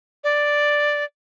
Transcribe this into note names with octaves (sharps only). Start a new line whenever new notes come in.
D5